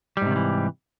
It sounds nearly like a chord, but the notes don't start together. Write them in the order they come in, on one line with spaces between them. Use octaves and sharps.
G3 G#2 C3 D#3 E3